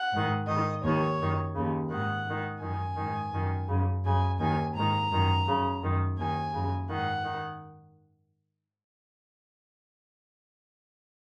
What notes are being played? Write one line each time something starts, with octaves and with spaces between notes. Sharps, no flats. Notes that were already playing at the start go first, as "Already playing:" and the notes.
Already playing: F#5
G#2 D#3
G#2 D#3 D#5
D#2 D#3 C#5
F#2 D#3
D#2 C#3
G#2 D#3 F#5
G#2 D#3
F#2 D#3 G#5
G#2 D#3
F#2 D#3
F#2 C#3
F#2 C#3 G#5
D#2 D#3 G#5
G#2 D#3 A#5
F#2 D#3
F#2 C#3
F#2 D#3
D#2 D#3 G#5
F#2 C#3
G#2 D#3 F#5
D#3